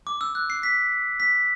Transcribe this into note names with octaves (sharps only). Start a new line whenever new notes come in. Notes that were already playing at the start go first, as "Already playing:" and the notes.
D6
E6
F#6
C7
B6
B6